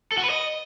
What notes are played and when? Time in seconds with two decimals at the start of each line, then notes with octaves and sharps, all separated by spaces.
0.12 A4
0.18 F#4
0.24 B4
0.30 D#5